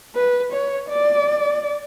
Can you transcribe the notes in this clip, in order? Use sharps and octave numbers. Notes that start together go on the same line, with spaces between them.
B4
C#5
D5